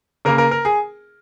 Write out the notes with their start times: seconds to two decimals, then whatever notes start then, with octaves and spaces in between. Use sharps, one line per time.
0.25 C#3 A#3 A#4
0.38 A#4
0.51 A#4
0.65 G#4